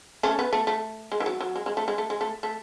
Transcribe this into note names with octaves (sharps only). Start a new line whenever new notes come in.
A3 C#4
B3
A3
A3
G#3
E3
F#3
F#3
G#3
G#3
A3
G#3
A3
G#3
A3
A3